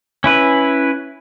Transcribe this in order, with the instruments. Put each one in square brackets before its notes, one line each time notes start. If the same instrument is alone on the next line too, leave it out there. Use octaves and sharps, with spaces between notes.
[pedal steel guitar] C#4 E4 B4